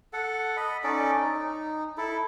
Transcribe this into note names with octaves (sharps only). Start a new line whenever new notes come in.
A4 F#5
D#5 B5
C#4 D#4 A4 D5
D#4
E4 A4